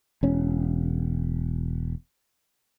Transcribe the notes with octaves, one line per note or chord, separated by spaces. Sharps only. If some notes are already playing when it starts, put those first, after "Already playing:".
E1 C#4